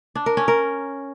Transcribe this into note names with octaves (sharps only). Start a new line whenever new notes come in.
D4
A#4
C#4
A#4